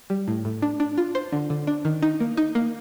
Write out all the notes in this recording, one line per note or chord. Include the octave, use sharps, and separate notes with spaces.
G3
A2
A2
D4
D4
F4
C5
D3
D3
D4
D#3
D#4
A#3
D#4
A#3